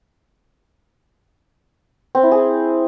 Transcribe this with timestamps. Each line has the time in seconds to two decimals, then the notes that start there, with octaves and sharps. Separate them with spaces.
2.15 C4
2.23 E4
2.32 G#4